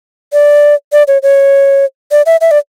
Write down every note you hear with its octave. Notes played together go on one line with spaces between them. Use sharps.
D5
D5
C#5
C#5
D5
E5
E5
D5